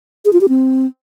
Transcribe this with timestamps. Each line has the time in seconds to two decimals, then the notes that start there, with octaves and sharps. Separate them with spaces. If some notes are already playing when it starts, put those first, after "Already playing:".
0.25 G#4
0.33 F4
0.41 G4
0.49 C4